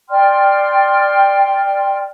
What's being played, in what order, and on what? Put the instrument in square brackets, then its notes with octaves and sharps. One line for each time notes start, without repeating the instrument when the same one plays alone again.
[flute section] D5 G5 C6 F6